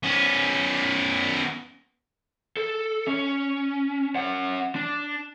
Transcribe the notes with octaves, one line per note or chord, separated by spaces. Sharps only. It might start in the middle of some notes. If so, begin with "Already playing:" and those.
B3 C#4
A4
C#4
C#4 F#5
D4